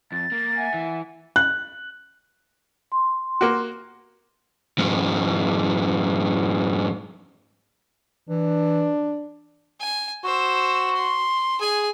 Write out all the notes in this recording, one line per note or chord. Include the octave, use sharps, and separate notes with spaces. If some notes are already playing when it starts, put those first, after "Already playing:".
F2 A6
A#3
E5 F#5 G#5
E3
F#6
C6
A#3 F#4
F2 G#2
E3 D4
G#5
F#4 C5 E6
C6
G#4 G#5